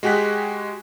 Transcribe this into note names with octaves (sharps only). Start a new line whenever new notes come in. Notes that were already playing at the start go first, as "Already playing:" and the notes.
G#3 F#4 G4 G#5 F#6 B6